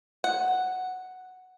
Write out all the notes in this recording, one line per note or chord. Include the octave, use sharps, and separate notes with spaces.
F#5